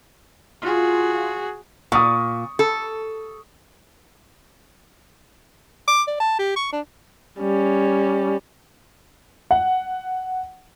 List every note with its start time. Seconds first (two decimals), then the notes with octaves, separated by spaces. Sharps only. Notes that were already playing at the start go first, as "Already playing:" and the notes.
0.62 F4 F#4 G#4
1.92 A#2 C#6 D#6
2.59 A4
5.88 D6
6.07 D5
6.20 A5
6.39 G4
6.56 C#6
6.72 D4
7.39 G3 C#4
9.51 F#5